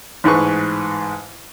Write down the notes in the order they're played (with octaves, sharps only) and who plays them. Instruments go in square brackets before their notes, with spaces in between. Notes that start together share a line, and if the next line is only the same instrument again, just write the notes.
[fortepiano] A1 G#2 G#3 B4 C#6